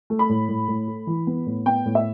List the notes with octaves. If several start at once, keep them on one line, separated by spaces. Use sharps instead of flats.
A3
B5
A2
A2
A2
A3
E3
B3
A2
B3 G5
A2
E5